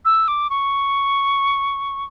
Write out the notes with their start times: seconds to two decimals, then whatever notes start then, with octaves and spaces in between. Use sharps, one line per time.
0.05 E6
0.28 D6
0.50 C#6